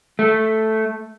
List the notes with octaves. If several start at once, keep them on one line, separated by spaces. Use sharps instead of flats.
A3